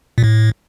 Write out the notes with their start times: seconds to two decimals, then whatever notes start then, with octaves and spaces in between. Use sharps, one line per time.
0.18 A#2
0.24 A2